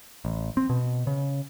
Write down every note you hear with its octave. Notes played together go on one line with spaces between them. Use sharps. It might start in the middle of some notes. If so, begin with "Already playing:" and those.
A1
C4
B2
C#3